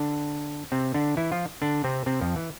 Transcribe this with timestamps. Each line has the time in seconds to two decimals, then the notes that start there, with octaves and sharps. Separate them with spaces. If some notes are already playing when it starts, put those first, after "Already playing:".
Already playing: D3 D4
0.72 C3 C4
0.94 D3 D4
1.17 E3 E4
1.32 F3 F4
1.62 D3 D4
1.84 C3 C4
2.06 C3 C4
2.21 F2 F3
2.36 E3